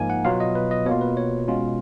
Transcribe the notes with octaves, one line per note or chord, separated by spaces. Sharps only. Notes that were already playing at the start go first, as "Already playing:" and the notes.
Already playing: G#2 F3 A#3 D#4 G#5
F#5
B2 F#3 B3 F4 F5
D#5
B4
D#5
B2 A#3 F4 C#5
B4
C#5
B2 G#3 C#4 F4